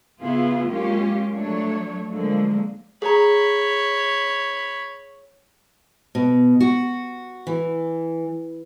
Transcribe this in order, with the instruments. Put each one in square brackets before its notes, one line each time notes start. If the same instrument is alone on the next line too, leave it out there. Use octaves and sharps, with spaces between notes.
[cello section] C#3 B3 E4 F4 G#4
F#3 G#3 A#3 C#4 F4 G4
F3 F#3 A3 D4 C#5
D3 F3 F#3 G#3 A#3
[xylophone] G#4 A#5 [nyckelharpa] C#5 B5
[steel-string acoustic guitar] B2
F#4
E3